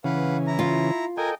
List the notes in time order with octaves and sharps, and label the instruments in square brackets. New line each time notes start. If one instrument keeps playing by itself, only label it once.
[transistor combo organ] C#3 E3 C#4 [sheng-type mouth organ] B4 F5 F#5
[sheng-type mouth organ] E4 A#5
[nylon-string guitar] F4
[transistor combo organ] A4 D#5 G5 [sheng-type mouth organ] A#4 G#5